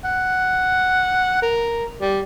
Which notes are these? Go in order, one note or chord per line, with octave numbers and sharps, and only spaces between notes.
F#5
A#4
G3